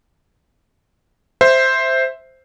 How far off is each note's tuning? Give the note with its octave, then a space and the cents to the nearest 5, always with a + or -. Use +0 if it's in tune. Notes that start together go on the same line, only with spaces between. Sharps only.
C5 +0 E5 +0